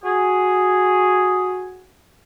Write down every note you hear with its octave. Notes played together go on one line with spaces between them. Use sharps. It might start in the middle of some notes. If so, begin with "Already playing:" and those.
F#4 G#4